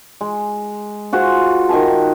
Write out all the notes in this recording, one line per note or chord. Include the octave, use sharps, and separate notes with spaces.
G#3
F4 F#4 G#4 C5
D#3 D#5 G#5 A5